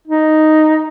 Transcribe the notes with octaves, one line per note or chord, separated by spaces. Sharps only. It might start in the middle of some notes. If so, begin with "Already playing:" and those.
D#4